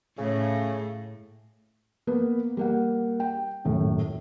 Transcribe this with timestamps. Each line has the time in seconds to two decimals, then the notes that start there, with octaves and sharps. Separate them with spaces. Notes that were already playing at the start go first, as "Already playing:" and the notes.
0.18 A2 C#3
2.07 A#3 B3 B4
2.57 G3 A#3 F#5
3.20 G5
3.65 D#1 F#2 A2